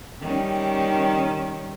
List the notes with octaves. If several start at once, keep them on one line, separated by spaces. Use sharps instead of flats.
D#3 G3 C#4